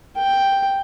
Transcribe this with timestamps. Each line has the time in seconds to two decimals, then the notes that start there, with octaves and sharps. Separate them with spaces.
0.16 G5